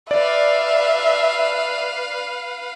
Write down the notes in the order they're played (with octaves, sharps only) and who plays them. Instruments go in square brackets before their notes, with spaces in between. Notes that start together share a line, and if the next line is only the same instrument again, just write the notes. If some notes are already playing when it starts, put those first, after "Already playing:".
[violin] B4 F5 [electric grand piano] D5 [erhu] E5